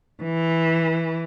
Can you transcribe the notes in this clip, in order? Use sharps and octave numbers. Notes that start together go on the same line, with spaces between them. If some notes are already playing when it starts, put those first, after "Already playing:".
E3